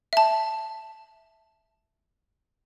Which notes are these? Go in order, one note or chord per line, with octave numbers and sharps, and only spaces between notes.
E5 A5